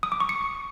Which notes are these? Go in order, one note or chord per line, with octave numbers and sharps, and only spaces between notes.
D#6
D6
C#6
C#7